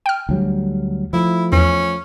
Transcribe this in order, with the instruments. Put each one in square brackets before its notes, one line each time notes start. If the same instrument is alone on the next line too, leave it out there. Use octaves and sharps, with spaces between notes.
[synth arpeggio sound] G5 F6
[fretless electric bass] D2 F#3 G3
[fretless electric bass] F3 A3 [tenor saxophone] E4
[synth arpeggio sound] E2 [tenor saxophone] C#4